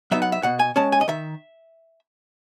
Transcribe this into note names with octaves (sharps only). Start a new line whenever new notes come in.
F#3 B3 D#4 E5
F#5
E5
B2 F#5
G#5
G#3 C#4 A5
G#5
D#5
D#3 E5